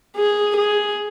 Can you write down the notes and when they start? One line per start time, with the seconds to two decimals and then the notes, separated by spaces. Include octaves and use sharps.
0.17 G#4
0.56 G#4